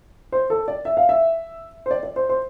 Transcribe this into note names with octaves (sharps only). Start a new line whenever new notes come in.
C5
A4
D5
E5
F5
E5
C5
D5
D5
C5
C5